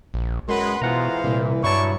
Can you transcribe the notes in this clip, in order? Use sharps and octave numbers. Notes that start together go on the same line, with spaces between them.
A#1
F#2 G#3 B4 F#5 C6
B2 E3 G#3 F4 C5 F5 F#5 A#5
C2 A#2
G2 F#3 E4 D5 A5 C#6